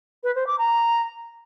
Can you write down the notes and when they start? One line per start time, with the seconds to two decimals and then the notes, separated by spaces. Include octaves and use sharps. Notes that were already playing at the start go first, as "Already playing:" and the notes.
0.24 B4
0.35 C5
0.47 D6
0.58 A#5